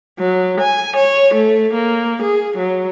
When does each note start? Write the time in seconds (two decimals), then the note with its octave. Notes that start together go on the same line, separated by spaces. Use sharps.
0.19 F#3
0.61 G#5
0.97 C#5
1.35 A3
1.74 A#3
2.23 G#4
2.58 F#3